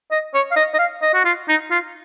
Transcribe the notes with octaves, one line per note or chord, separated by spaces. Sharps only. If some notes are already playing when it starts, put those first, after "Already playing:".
D#5
C#5
F5
D#5
D#5
F5
D#5
F#4
F4
D#4
F4